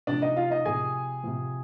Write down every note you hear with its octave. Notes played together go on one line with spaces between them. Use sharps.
C3 F3 D4 D5
D#4 D#5
F4 F5
D#4 D#5
C3 F3 G#4 G#5
C3 F3